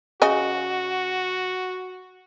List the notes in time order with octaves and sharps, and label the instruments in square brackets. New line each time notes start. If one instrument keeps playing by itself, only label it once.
[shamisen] C#3 D#5 G#5 [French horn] F#4